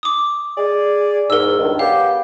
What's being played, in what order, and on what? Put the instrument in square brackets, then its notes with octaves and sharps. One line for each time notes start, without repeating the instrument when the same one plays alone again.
[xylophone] D6 D#6
[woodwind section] G#4 D5
[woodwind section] E2 G#2 [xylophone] A#4 E6
[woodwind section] C#2 G2 D#3
[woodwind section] C#3 B3 G4 [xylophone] F5